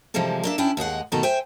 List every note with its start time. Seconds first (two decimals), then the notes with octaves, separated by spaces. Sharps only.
0.14 C3 E3 F3 G3 G#3 A4
0.43 A#3 D4 E5
0.58 C#4 D4 E4 G5
0.77 D#2 G#3 G#4 F#5
1.12 D2 B2 D#3 A#3 A4 A#5
1.23 C5 E5 G5 G#5